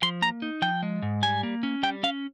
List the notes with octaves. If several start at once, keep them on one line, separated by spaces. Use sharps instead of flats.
F3 C6
A#3 A#5
D#4
F3 G5
G#3
G#2
G3 G#5
A#3
C#4
G3 G5
C#4 F5